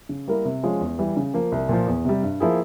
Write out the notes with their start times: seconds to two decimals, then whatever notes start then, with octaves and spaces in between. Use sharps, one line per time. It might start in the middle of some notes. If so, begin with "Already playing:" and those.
0.09 C#3
0.27 G3 A#3 E4 A#4
0.45 C3
0.63 F3 G#3 C#4 F4
0.81 E2
0.99 E3 G3
1.17 C#3
1.34 F3 A#3 F4
1.52 C2
1.69 A#2 F3
1.87 E2
2.05 C3 G3
2.23 G2
2.40 F3 A#3 E4 G#4